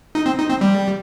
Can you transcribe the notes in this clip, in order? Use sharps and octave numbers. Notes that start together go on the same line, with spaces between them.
D#4
C4
D#4
C4
G3